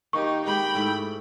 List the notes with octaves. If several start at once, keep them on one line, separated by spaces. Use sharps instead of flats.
D#3 A#3 D#4 G4 C#6
G#3 G4 G5 B5
G#2 A3 E4